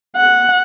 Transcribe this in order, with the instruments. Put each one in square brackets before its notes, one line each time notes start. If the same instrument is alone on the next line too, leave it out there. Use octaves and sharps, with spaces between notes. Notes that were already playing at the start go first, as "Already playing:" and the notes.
[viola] F#5